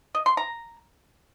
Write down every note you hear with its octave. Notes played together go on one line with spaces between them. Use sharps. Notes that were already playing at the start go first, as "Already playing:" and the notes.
D#5
C6
A#5